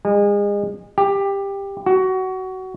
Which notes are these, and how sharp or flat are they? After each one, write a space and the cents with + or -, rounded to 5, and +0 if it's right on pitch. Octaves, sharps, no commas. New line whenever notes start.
G#3 -35
G4 +15
F#4 +20